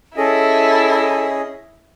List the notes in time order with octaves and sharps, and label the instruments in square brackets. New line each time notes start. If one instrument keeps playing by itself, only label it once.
[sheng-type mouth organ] C#4 G#4 D#5 [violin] E4 [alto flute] A4